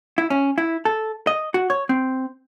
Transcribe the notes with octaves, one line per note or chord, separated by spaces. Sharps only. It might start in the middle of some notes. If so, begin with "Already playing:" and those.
E4
C#4
E4
A4
D#5
F#4
C#5
C4